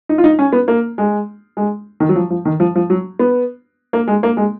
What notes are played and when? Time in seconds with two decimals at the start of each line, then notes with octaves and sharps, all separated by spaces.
0.09 D#4
0.18 F4
0.24 D#4
0.39 C#4
0.53 B3
0.68 A#3
0.98 G#3
1.57 G#3
2.00 D#3
2.09 F#3
2.16 F3
2.30 F3
2.45 D#3
2.60 F3
2.75 F3
2.90 F#3
3.19 B3
3.93 A#3
4.08 G#3
4.23 A#3
4.37 G#3